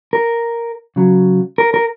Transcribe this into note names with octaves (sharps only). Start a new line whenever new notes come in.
A#4
C#3 F#3
A#4
A#4